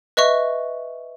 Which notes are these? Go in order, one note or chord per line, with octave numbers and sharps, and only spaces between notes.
B4 D#5 E5 C#6